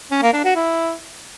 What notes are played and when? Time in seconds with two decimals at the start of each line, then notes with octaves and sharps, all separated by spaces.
0.11 C#4
0.22 A#3
0.33 D4
0.44 F#4
0.55 E4